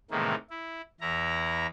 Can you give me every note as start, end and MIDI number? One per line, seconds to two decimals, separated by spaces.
0.11 0.35 45
0.11 0.35 48
0.11 0.35 51
0.11 0.35 52
0.11 0.35 56
0.11 0.35 58
0.50 0.81 64
1.01 1.66 40
1.01 1.66 64
1.01 1.66 82